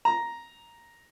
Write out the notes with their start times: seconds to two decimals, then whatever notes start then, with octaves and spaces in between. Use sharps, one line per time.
0.05 A#5